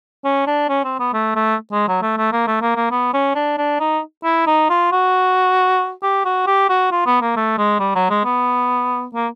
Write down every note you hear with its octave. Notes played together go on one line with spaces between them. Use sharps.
C#4
D4
C#4
C4
B3
A3
A3
G#3
F#3
A3
A3
A#3
A3
A#3
A#3
B3
C#4
D4
D4
D#4
E4
D#4
F4
F#4
G4
F#4
G4
F#4
F4
B3
A#3
A3
G#3
G3
F#3
G#3
B3
A#3